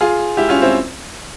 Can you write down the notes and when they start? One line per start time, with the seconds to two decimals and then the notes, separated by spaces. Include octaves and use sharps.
0.01 F4 G#4
0.37 E4 G4
0.49 C#4 F4
0.62 C4 E4